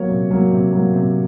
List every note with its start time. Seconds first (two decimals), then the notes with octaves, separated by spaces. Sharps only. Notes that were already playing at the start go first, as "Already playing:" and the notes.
Already playing: F#3 A#3 C#5
0.09 C3
0.31 F#3 A#3
0.51 C3
0.72 F#3 A#3
0.93 C3